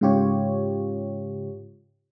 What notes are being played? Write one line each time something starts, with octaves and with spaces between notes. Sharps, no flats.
G#2 C#3 F4 G4 C#5